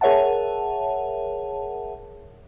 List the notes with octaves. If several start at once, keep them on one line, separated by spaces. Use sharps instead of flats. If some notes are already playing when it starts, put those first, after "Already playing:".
G#4 A#4 C#5 E5 F#5 A5